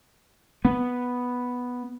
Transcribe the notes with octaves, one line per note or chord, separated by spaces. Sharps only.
B3